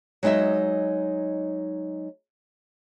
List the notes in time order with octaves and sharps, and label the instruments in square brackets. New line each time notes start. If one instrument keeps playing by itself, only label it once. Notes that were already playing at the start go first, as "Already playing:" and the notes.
[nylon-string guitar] F#3 G#3 D#4 D#5 E5